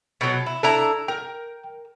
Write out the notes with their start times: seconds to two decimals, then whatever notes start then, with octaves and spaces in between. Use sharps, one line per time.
0.21 B2 F#3
0.46 E4
0.63 D4 E4 A4 A#5
1.08 A#4 G5